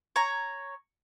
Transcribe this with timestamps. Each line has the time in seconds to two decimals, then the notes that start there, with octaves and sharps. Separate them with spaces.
0.16 C#5 A#5